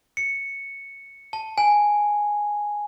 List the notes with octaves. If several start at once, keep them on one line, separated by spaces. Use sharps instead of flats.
C#7
A5
G#5